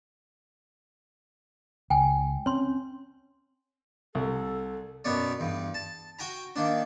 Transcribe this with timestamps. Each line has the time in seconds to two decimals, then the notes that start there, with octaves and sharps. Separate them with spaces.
1.90 C#2 G5 G#5
2.46 C4 C#4 C#5 C6
4.15 C2 A4
5.04 F#2 B2 B3 C#5 D5
5.40 E2 G2
5.74 A5
6.19 F#4 G5 G#5 A#5
6.56 D#3 A#3 D4